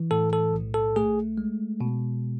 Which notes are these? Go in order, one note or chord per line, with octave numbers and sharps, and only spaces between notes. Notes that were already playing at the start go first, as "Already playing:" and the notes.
Already playing: E3
A2 A4
A4
B1
A4
A3 G#4
G#3
B2